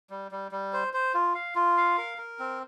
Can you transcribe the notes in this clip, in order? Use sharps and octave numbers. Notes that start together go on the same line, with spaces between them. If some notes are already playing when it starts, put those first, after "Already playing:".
G3
G3
G3
C5
C5
F4
F5
F4
F5
A#4
A#4
C4